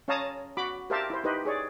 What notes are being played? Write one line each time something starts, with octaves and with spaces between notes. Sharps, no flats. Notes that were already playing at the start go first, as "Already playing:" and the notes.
C#4 C#5 F5 A5 A#5 D#6
F#4 B5 D6
G4 A#4 C5 E5 F5 A5
E4 C5
D#4 G4 B4 C5 D#5
G#4 C#5 D5